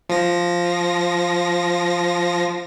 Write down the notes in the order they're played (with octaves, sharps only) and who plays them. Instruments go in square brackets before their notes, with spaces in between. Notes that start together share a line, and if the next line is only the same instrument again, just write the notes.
[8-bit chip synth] F3 A#6